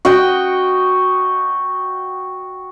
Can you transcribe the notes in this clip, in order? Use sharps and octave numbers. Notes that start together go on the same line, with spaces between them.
F#4 D#5 G5